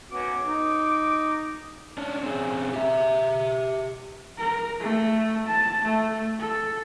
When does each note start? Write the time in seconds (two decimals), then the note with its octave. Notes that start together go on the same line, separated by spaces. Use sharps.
0.12 B3 C#4 F#4 D6
0.43 D#4
1.98 C#4 D4
2.23 C4 C#4 G#4
2.74 G4 E5
4.38 A#4
4.80 A3
5.47 A5
5.85 A3
6.39 A4